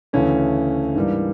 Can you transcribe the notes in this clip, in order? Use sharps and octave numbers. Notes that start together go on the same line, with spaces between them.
D2 C#3 E3 A3 C#4
G#2 E3 G3 A#3 D4